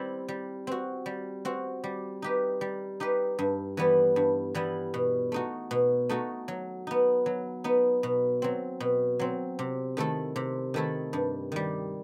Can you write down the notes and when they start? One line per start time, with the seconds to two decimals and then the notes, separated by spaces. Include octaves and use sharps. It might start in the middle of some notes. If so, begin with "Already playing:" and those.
Already playing: G3 C4 E4
0.28 G3
0.67 C4 F#4
1.06 G3
1.45 C4 F#4
1.84 G3
2.22 D#4 G4 B4
2.61 G3
3.00 D#4 G4 B4
3.39 G2
3.77 E3 G3 B3 E4
4.16 G2
4.54 E3 G3 B3 E4
4.94 B2
5.32 A3 D#4 F#4
5.71 B2
6.09 A3 D#4 F#4
6.48 F#3
6.87 B3 D#4
7.26 F#3
7.64 B3 D#4
8.03 B2
8.42 F#3 C4
8.80 B2
9.19 F#3 C4
9.59 C3
9.97 D#3 A3 E4 A4
10.36 C3
10.74 D#3 A3 E4 A4
11.13 G2
11.52 D#3 G3